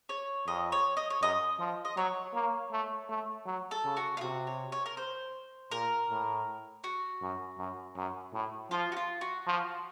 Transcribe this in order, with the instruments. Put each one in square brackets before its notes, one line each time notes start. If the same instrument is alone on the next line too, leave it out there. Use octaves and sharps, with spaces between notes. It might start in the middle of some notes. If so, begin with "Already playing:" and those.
[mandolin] C#5
[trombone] F2 [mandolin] D#5
[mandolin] C#5
D#5
C#5
[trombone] F#2 [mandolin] D#5
[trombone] F3
[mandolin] D#5
[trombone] F#3 [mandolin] C#5
[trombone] A#3
A3
A3
F#3
[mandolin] A4
[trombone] C#3
[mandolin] F#4
F4
[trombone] C3 [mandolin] F#4
[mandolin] C#5
C#5
A#4
C5
[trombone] A#2 [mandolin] A#4
[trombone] A2
[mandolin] F#4
[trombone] F#2
F#2
F#2
A2
[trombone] F3 [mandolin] F4
[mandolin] F#4
F4
F#4
[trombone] F3